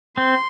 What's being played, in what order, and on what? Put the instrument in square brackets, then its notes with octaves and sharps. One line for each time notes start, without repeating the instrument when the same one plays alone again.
[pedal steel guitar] C4 [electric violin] C6